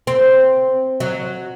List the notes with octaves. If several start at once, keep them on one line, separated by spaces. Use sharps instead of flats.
C4
F#3